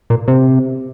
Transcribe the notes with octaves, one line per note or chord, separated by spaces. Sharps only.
A#2
C3